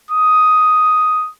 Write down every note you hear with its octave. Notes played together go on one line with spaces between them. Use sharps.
D#6